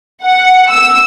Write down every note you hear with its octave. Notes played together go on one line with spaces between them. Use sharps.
F#5
E6